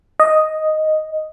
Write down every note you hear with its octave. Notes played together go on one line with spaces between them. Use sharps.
D#5